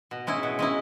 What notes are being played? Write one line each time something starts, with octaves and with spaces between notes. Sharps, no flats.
B2
G#3 C#4 E4
B2
G#3 C#4 E4